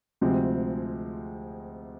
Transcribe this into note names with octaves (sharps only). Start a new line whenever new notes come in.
D2 C3 F3 G#3 C4